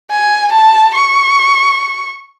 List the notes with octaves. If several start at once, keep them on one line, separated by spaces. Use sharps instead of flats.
G#5
A5
C#6